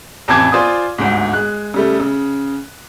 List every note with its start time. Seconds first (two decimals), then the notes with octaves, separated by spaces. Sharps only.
0.28 A1 F2 E3 A5 D6 G#6
0.52 F4 C5 D5 G#5 C6 D#6
0.98 G1 D2 G#2
1.33 G#3 F#6
1.74 C#3 G3 A3
2.00 C#3